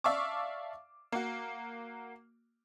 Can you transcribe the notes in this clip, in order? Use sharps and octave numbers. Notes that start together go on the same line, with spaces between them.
D5 E5 F5 A5 C#6 D6
A#3 F#4